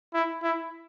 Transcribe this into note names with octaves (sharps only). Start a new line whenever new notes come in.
E4
E4